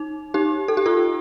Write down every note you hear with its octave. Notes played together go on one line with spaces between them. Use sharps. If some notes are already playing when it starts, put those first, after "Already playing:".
Already playing: D#4
D#4 G4
A4
G4
F4 A4